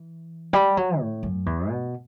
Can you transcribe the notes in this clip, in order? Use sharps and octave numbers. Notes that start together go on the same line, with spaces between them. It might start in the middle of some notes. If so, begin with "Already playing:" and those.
Already playing: E3
G3
F#3
A2
F#2
E2
B2